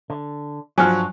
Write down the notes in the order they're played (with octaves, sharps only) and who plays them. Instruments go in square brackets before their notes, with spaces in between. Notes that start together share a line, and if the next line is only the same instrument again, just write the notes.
[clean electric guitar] D3
[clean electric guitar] G2 D4 F#4 [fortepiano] F3 F#3 [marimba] G#5 F6